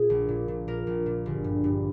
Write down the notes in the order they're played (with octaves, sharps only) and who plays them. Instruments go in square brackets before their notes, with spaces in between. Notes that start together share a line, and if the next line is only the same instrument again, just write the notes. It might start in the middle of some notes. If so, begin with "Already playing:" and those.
Already playing: [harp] A#2 G#4
A#1
A#2
A#2
A#2 A#4
A#1
A#2
G1
G2
G2